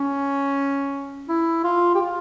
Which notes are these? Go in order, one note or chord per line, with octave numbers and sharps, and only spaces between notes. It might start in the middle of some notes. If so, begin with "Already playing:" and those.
Already playing: C#4
E4
F4
G4
F4